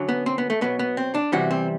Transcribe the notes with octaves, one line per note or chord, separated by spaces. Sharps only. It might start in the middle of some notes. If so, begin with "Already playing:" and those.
Already playing: F#2 D3 F#3
B3
C4
B3
A3
B2 F#3 B3
B3
C4
D4
E2 C3 E3 G3 F#4
C4